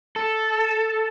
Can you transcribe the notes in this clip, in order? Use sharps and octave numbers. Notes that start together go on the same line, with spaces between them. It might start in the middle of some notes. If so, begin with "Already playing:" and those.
A4